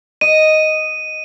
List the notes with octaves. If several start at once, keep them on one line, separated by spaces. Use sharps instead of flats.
D#5 D#7